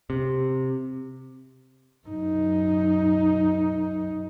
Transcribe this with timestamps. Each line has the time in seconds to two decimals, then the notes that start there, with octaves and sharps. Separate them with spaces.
0.10 C3
2.07 F#2 D#4